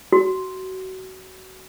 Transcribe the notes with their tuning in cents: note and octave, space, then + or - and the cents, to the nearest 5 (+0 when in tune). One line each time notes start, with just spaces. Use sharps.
F#4 +25